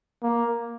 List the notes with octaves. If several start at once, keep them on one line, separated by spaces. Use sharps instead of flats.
A#3